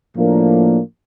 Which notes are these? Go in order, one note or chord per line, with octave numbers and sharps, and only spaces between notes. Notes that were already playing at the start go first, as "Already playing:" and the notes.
A2 F3 A#3 D4